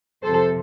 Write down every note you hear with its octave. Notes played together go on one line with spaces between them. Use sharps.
F2 C3 F3 A4 C5